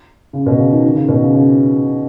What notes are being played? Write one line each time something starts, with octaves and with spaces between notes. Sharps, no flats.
C#3
B2
C#3
D#3
D#3
C#3
B2
C#3
C#3